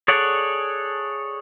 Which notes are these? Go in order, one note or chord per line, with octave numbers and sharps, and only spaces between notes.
G#4 A4 C#5 D5 F#5